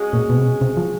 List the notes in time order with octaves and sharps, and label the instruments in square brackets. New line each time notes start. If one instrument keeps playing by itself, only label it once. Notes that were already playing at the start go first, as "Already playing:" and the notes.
Already playing: [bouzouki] G#3 C#4 F#4
[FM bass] A#2
B2
C3
B2
C3
F3